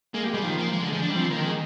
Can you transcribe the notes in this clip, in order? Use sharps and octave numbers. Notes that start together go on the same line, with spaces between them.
G#3 A#3
G3
G#3
G3
D#3 F3
A#3
G#3
D3
G#3
F3
D4
G3
F3 C4
D#3 A#3
G#3